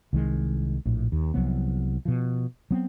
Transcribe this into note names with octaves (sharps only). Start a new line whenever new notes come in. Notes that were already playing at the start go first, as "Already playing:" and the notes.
C2 D#3 G#3
A#1 A2
D#2
C2 F3 F#3 B3
B2 F3
F#3 B3 C4